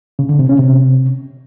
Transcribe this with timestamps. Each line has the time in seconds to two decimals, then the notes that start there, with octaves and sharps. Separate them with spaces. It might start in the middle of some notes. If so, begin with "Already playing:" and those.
0.19 C#3
0.29 D3
0.39 C3
0.49 C#4
0.59 C3